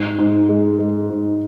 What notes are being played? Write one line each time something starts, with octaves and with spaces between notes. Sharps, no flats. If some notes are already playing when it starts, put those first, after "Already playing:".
Already playing: G#2
G#2
G#3
G#3
G#2